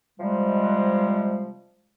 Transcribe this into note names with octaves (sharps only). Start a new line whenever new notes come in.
C3 F3 G3 G#3